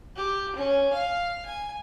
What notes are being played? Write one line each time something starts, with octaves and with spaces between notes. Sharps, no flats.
G4
C#4
F5
G#5